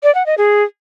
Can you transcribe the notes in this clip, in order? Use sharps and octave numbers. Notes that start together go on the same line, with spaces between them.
D5
F#5
D#5
G#4